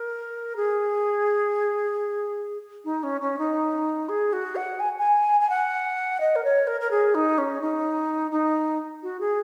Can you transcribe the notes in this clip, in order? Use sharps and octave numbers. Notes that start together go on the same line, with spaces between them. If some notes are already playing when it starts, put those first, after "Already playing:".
Already playing: A#4
G#4
D#4
C#4
C#4
D#4
G#4
F#4
F#5
G#5
G#5
G#5
F#5
D#5
A#4
C#5
A#4
A#4
G#4
D#4
C#4
D#4
D#4
F#4
G#4